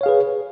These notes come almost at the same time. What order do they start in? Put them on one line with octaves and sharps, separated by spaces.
C#5 F5 G#4 B4